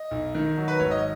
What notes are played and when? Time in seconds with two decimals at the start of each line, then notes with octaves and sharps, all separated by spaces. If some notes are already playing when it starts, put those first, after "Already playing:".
Already playing: D#5
0.11 B1
0.35 D#3
0.57 F#3
0.68 B4
0.79 G#1 C#5
0.91 D#5